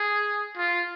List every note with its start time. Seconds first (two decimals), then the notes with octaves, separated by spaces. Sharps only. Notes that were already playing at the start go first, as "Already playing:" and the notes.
Already playing: G#4
0.57 F4